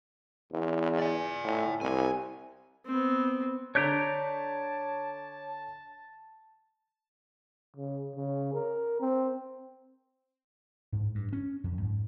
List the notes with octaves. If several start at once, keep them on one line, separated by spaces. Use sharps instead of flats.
E2
D5 G#5
A2
C2 G#5
B3 C4
D3 C#5 D5 A5 A#5 G6 B6
C#3
C#3
A#4
C4
G#2
G2
C#4
F2
G#2